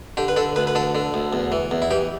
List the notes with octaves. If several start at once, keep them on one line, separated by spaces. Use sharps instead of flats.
D3 G4
B4
D3 A4
D2 B4
B4
D3 A4
D3
D2
E2
E3
E2
E4
E3 G4